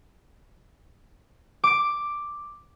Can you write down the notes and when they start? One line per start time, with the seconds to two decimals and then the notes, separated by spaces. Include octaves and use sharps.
1.64 D6 D7